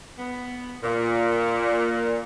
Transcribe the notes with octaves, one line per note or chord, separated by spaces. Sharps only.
B3
A#2